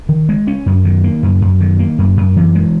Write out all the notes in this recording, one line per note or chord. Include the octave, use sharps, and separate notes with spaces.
D#3
G#3
C#4
F#2
D#3
A#3
F#2
F#2
D#3
A#3
F#2
F#2
E3
G#3